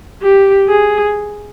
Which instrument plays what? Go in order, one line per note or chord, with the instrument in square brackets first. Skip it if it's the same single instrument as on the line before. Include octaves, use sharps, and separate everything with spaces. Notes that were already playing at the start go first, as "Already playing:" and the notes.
[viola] G4
G#4